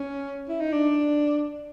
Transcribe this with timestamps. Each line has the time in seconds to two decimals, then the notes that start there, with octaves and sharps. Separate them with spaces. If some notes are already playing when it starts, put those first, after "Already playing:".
Already playing: C#4
0.48 E4
0.60 D#4
0.73 D4